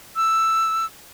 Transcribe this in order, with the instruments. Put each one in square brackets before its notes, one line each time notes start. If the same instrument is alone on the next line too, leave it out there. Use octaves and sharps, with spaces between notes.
[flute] E6